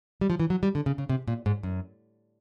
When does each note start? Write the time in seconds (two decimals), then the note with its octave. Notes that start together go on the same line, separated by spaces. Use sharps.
0.21 G3
0.30 F3
0.40 E3
0.50 F#3
0.63 G3
0.75 D3
0.86 C#3
0.98 C#3
1.09 C3
1.28 A#2
1.46 G#2
1.63 F#2